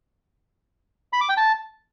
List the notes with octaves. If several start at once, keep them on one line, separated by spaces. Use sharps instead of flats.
B5
D6
G5
A5